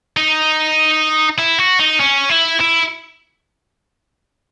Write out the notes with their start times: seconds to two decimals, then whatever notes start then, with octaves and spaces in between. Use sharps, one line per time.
0.17 D#4
1.38 E4
1.58 F#4
1.79 D#4
2.00 C#4
2.29 E4
2.60 E4